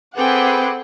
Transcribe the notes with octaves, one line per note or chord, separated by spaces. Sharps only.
C4 G#4 A4 B4 F#5 G5 D6